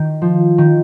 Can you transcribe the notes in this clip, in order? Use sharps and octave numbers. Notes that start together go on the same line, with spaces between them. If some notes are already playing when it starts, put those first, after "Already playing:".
Already playing: D#3
F3
D#3